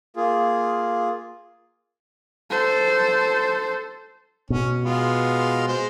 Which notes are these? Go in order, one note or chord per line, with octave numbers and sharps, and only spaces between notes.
A#3 F4 G#4
A4 C5
B2 C#4
G#3 B3 F4
G#3 C5